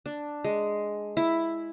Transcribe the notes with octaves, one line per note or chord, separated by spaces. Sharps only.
D4
G#3
E4